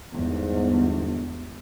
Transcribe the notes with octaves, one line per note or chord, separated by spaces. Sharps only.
G1 E2 G#2